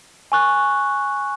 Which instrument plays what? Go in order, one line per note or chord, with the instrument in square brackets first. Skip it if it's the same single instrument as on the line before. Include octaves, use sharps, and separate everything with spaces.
[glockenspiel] G#5 C#6 F#6